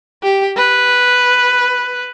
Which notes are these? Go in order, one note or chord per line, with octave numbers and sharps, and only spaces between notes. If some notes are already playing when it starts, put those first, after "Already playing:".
G4
B4